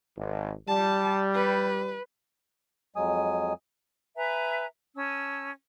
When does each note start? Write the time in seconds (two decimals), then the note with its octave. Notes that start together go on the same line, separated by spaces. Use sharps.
0.17 G#1
0.68 G3 A5
1.34 B4
2.96 F2 F#3 G#3 G#5 D#6
4.16 B4 E5 G#5 A#5
4.96 C#4 A5 E6